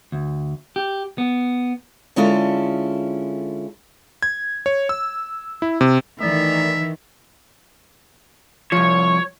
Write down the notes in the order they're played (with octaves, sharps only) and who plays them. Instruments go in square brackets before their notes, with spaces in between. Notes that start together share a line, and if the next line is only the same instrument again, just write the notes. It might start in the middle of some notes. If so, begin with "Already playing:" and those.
[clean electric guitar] D2
G4
B3
[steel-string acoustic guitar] D3 G#3 C#4 E4 F4 A4
[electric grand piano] G#6
C#5
E6
E4
C3
[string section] D#3 E3 [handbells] A3 D5 [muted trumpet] E5
[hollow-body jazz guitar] C2 F3 [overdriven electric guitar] C#5